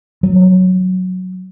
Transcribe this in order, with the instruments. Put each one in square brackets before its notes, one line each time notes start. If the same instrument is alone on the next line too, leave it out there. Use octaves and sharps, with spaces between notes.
[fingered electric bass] F#3